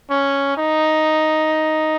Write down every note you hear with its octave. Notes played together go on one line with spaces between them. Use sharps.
C#4
D#4